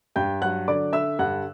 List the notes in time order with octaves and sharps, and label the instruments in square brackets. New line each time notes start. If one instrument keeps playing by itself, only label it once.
[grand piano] G2 G5 G6
F#3 F#5 F#6
D3 D5 D6
D3 E5 E6
G2 F#5 F#6